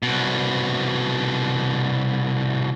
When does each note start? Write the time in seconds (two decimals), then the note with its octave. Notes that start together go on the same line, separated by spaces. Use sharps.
0.03 C2 B2